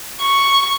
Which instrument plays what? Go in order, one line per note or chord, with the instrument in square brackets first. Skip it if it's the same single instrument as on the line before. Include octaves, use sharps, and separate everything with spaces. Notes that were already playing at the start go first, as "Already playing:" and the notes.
[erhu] C#6